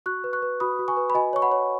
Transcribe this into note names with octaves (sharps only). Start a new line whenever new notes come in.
F#4 C#6 F#6
B4
C#6 F#6
B4
F#4 B5 D#6
F#4
G#5 C#6
B4
B5
F#4 D#5 G#5
C#5 C#6
F#5 B5
C#5